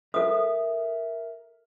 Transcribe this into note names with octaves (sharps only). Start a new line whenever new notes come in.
A4 A#4 E5 D#6